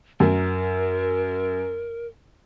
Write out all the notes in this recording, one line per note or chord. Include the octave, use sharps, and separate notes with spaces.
F#2 A#4